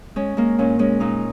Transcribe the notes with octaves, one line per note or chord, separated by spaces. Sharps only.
G#3 C#4
G#3 A#3
A#2 C#4
G#3 C#4
A#2 D#4